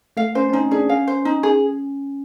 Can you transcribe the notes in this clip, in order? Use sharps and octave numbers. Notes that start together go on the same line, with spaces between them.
A3 F5
C#4 C5
C4
C#4 D#4
D4 G#4
C#4 F5
C5
D#4
G#4